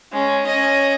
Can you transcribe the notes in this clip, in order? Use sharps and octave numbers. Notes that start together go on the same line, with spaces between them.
G#3 C#4
C#4 D#5